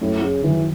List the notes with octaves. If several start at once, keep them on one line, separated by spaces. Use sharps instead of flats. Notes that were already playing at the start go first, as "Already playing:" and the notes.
F#2 A2
C#3
D#3 E3 F#3